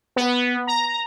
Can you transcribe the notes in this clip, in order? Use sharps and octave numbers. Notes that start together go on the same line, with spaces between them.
B3
A#5